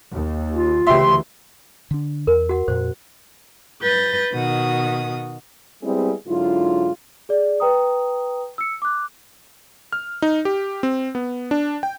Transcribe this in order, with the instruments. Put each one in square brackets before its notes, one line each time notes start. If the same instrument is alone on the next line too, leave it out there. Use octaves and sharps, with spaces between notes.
[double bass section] D#2
[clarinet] F4
[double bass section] D2 C#3 E3 [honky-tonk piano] G4 E5 [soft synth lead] C6
[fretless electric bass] D3 D4
[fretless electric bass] E2 [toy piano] A#4
[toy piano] F#4 F#5
[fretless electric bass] F2 A#2 [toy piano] C5
[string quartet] B4 G6 A6 A#6
B2 D#3 F#4 D#6
[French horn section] G3 G#3 B3 C4 E4 G#4
G#2 D3 F#3 E4 F4
[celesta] G#4 D5
B4 G5 A#5 D#6
E6 C#7
D6 F#6
[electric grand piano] F6
D#4
G4
C4
B3
D4
G5